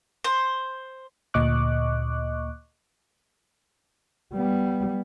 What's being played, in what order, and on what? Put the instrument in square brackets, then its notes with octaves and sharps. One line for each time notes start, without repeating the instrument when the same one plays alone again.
[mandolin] C5
[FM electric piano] D2 A#2 D#5 C#6 D6 F#6
[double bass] G3 B3